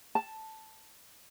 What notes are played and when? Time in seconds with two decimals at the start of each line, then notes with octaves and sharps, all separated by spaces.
0.15 A5